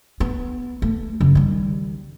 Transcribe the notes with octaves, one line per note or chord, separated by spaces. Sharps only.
B3
A3
F#2 C#3
D#3 G3